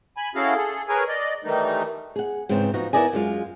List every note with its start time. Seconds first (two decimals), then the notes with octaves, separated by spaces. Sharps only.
0.17 G#5 B5
0.35 C#4 E4 F#4 G#4 A4 F5
0.55 G#4 A4
0.89 G#4 A#4 B4 C#5 G#5
1.08 D5 D#5
1.44 D#3 E3 G3 A3 D#4
2.16 G#4 F#5
2.49 G#2 C#3 E3 C4
2.74 F3 B3 D#4 F#4
2.93 B3 E4 A#4 D5 D#5 G#5
3.13 F#2 G#3 F4